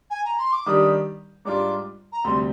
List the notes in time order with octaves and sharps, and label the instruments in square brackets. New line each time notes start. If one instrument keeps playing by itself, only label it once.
[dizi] G#5
A#5
C6
D6
[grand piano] D#3 G3 D4 G4 [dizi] D#6
[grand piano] G#2 G3 D4 F4 [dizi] D6
[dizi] A#5
[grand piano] D2 C3 G3 [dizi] C6